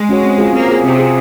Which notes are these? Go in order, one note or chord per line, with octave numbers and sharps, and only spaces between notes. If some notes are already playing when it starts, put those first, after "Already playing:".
Already playing: G#3
C#4 F#4 C#5
C4
F4 G#4
A#3 C4
F4 G#4
C3 C4
F4 G#4